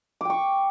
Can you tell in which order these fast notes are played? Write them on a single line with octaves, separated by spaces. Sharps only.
D6 G5 C#6